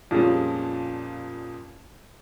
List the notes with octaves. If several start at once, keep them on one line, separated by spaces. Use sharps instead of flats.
F2 A#2 F3 G3 G#3 C#4